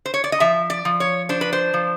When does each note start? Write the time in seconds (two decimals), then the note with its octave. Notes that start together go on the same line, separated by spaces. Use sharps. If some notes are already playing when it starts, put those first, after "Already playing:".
0.06 C5
0.14 C#5
0.24 D5
0.32 D#5
0.40 F3 E5
0.70 D5
0.85 F3
1.00 C#5
1.29 D4 C5
1.41 B4
1.53 C5
1.74 F3